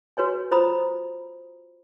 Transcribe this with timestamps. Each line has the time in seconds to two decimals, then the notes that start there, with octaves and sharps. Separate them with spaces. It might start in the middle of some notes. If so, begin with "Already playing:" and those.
0.17 F#4 B4 C#5 G#5
0.51 F4 C5 A#5 B5 D#6